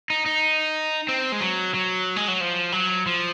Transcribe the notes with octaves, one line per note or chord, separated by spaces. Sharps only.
D#4
D#4
C4
G#3
F#3
F#3
G#3
F#3
F3
F#3
F3